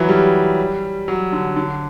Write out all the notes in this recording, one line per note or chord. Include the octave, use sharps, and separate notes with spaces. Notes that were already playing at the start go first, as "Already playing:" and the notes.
Already playing: E3 F#3
G3
F#3
D3
D3